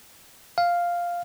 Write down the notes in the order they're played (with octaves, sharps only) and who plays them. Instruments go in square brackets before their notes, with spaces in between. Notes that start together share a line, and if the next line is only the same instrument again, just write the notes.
[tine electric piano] F5